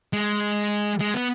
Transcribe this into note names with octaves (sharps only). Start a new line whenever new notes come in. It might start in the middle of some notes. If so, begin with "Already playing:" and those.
G#3
G#3
B3